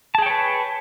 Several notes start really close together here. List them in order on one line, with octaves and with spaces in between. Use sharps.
A5 G#4 G5 C#5 B4